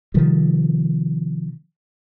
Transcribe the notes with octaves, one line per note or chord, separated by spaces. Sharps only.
C3 D#3 F3 G3